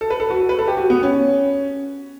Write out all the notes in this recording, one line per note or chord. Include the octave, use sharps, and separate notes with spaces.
A4
B4
A4
F#4
B4
A4
G4
F#4
B3
C#4